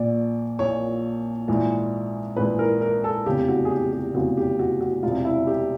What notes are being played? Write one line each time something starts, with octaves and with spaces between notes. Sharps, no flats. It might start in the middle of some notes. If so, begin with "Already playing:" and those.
Already playing: A#1 A#2 D5
A#1 A#2 C#5
A#1 G#2 E3
A#1 G#2 E3 B4
A#4
A#4
A4
F1 E2 C#3 G4
F#4
G#4
G4
G4
F1 E2 C#3 F#4
G4
F#4
F#4
E1 E2 C3 F4
E4
G4